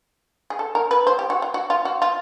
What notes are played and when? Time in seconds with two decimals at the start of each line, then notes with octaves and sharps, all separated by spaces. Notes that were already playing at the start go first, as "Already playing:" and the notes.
0.50 G#4
0.59 A4
0.75 A#4
0.91 B4
1.07 C5
1.19 G4
1.30 F#4
1.42 F4
1.54 F#4
1.70 F4
1.85 F#4
2.02 F4